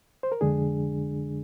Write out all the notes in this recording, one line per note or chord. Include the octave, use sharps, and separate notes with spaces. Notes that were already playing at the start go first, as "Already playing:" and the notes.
C5
A#4
F2 D3 G#3 D4 G#4